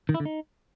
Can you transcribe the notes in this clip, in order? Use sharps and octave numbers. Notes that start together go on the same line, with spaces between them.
D#3
E4
D3
D#4